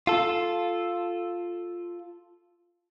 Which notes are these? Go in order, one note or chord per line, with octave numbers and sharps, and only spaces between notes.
F4 A4